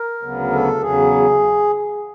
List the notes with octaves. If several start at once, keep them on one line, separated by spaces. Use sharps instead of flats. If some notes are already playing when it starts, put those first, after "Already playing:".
Already playing: A#4
D2 C#3 F#3 B3
A4
E2 C#3 F#3 G#4